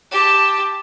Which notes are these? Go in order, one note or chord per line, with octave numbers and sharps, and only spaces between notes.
G4 A5